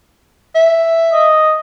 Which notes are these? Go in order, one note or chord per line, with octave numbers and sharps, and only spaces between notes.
E5
D#5